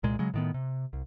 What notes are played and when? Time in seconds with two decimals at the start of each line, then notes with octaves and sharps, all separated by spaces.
0.03 C2 A#2 G#3
0.19 C#3 F#3 G#3
0.34 A2 D#3 B3
0.54 C3
0.93 C2